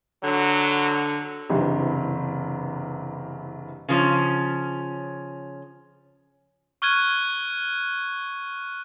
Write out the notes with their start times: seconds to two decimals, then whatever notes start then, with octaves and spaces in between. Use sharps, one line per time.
0.23 D3 F#3
1.50 F#1 G2 C3 E3
3.89 C#3 F3 C#4
6.82 C#6 F6 F#6 G#6 D#7